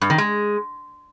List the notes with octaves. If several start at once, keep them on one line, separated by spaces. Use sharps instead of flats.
G2
D#3
G#3